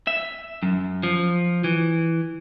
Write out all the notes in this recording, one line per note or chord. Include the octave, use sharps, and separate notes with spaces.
E5
F#2
F3
E3